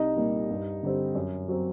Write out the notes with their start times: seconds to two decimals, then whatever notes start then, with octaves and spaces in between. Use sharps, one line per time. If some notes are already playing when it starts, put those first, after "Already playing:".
Already playing: C2 D#4 D#5
0.16 A#2 G3 A#3
0.50 G2
0.83 D3 G3 C4
1.15 F#2
1.48 F#3 C4